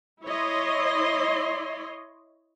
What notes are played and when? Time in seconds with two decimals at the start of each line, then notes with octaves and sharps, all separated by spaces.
0.24 E4 C#5 D#5 C6